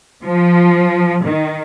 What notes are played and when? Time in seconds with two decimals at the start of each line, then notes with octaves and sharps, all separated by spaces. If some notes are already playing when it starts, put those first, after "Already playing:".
0.24 F3
1.25 D#3